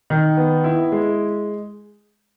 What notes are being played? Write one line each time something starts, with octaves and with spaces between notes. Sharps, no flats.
D#3
B3
E4
G#3